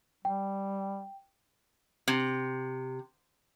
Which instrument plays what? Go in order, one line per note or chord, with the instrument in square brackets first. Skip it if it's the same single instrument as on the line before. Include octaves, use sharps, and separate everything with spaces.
[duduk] G3 [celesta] G5
[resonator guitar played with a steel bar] C3